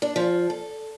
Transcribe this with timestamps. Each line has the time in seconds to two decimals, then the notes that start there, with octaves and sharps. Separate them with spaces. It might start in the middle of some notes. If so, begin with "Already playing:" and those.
0.02 D4
0.16 F3
0.50 A4